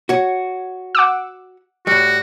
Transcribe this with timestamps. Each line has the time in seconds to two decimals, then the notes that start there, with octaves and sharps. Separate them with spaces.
0.09 F#4 C#5
0.95 F#5 D6 E6
1.87 A2 G3 F#4